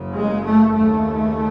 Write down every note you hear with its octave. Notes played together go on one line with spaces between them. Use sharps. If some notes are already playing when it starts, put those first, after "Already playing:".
Already playing: F#1 F#2 C#3
G#3
A3
D#2 C#3 A3